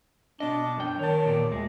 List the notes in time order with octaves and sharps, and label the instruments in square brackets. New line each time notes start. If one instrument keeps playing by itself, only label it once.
[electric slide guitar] B2 D#5 [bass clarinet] D4
[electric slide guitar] F#2 G5
[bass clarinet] D#3 [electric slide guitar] C#5 A5
[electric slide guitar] E2 A#2 G4
[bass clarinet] D2 [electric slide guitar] G#3